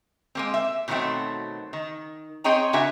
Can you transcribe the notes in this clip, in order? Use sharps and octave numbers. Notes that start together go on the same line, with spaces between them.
G#3 A#3 C4
E5
B2 D#3 F#3 G3 A3 C4
D#3
C4 G#4 C#5 D#5 G5 A#5
C#3 D4 F#4 A#4 E5 G#5